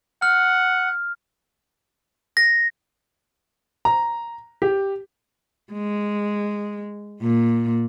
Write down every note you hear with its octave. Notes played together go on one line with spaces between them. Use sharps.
F#5 F6
A#6
A#5
G4
G#3
A#2